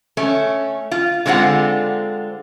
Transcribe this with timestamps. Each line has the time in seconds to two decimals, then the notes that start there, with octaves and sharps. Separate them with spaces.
0.17 A3 C#4
0.91 F4
1.26 D3 G#3 C4 F4 F#5